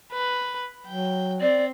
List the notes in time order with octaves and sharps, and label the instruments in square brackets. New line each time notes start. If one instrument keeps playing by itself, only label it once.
[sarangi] B4
[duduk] F#3 [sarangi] G5
[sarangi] C4 [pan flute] D5